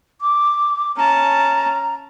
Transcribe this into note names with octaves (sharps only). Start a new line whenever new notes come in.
D6
C#4 A5 A#5